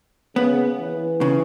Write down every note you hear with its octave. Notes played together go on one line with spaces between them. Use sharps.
C#3 B3
E3
C#3